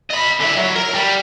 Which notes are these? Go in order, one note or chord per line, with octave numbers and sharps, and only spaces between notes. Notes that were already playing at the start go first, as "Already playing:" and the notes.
D#5 B5
D3 E4
F#3
A#4
G3